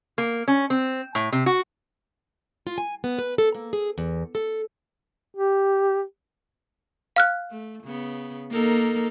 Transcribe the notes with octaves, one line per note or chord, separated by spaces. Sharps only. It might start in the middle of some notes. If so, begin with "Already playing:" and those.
A#3
C#4
C4
A2
C3
F#4
F4
G#5
B3
B4
A4
A#3
G#4
E2
A4
G4
F5 F6 F#6
A3
C#3 B3
A#3 D#4 A4 A#4